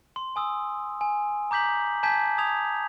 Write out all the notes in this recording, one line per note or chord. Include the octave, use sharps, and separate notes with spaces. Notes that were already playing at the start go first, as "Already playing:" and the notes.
C6
G#5 D#6 E6
G#5
A#5 D6 G6 B6 F#7
G#5 A5 G6 G#6 B6
D#6 G#6 F7